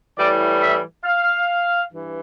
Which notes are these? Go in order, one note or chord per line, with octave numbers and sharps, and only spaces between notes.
A2 E3 G3 D5
E5
F5
G2 E3